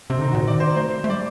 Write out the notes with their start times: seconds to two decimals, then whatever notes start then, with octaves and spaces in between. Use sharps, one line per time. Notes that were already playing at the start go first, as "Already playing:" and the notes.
0.10 C3 C4
0.18 D3 D#4
0.27 D#3
0.31 A#2 F#4
0.42 D#3
0.47 D5
0.60 C5
0.76 A3 C5
1.04 A3
1.09 G3 D5